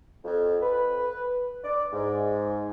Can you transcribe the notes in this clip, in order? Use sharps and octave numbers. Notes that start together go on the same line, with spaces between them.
F2
B4
D5
G#2